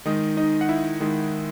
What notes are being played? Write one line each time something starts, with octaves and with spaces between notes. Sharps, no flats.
D#3 G#3 D#4 D#5
D#4 D#5
F#5
E4 E5
D#3 G#3